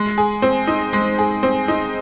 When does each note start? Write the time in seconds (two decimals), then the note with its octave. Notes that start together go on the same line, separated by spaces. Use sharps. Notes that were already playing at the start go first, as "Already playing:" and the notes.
Already playing: G#3
0.18 G#4
0.42 C4
0.67 D#4
0.93 G#3
1.18 G#4
1.43 C4
1.68 D#4